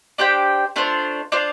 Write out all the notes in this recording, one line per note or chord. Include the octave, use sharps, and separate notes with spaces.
D4 G4 C5 G5
A3 D4 F4 C5
D4 F4 C5